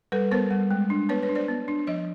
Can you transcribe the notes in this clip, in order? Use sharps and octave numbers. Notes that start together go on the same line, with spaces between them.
G3 A4 B4
B3 A#4 C5
G3
G#3
D4
B3 B4 C#5
B4 C#5
D4
C5 D5
B3
D4
F3 C#5 D#5